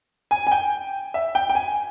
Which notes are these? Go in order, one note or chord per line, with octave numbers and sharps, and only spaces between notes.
G#5
G#5
G5
E5
G5
G5
G#5